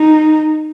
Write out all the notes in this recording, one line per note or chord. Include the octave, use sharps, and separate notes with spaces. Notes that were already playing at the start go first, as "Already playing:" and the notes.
Already playing: D#4